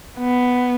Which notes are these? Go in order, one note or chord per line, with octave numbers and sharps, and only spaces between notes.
B3